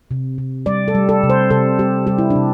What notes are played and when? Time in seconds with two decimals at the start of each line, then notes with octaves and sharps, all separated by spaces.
0.11 C3
0.38 C3
0.66 G3 D5
0.88 A4
0.95 G3
1.09 A4
1.23 C3
1.30 C5
1.50 C3 A4
1.79 G3 G4
2.07 G3 G4
2.18 E4
2.30 D4
2.36 C3